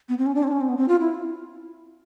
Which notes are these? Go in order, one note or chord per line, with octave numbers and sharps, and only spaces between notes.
B3
C4
C#4
D4
C4
D4
C#4
C4
B3
C4
F4
E4